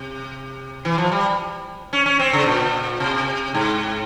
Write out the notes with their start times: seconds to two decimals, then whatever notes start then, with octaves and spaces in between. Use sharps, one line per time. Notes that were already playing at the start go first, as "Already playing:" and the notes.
Already playing: C3
0.85 E3
0.98 F3
1.12 G3
1.93 C#4
2.06 C#4
2.19 C4
2.33 C#3
2.46 A#2
3.00 C3
3.54 G#2